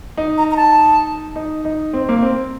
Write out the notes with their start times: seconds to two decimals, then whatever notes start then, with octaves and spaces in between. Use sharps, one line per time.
0.17 D#4
0.38 A#5
0.51 A#5
0.57 A5
1.36 D#4
1.65 D#4
1.93 C4
2.09 A#3
2.22 C4